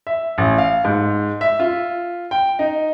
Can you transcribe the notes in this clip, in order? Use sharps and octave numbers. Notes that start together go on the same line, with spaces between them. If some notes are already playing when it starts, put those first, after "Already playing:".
E5
A1
F5
G#2
E5
F4
G5
D#4